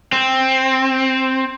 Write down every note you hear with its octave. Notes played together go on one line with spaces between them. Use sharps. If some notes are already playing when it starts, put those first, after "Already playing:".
C4